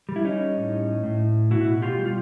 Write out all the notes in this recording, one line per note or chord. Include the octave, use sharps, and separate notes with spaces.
G3
E4
C#4 D#4
A2
A2
B2 E4 F#4
F4 G4
G3
F4